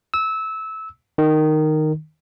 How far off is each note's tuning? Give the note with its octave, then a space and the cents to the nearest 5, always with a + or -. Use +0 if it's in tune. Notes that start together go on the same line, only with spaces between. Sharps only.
E6 -20
D#3 -10